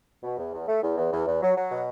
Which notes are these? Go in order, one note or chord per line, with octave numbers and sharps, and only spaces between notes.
B2
E2
E2
A3
E2
E2
E2
E2
F#3
F#3
B2